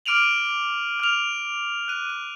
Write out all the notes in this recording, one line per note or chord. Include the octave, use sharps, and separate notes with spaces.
D6 F6 D7 D#7 F7 F#7
F6 F7
F#6 D#7
D#7